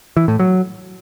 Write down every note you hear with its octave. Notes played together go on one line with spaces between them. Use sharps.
E3
A2
F#3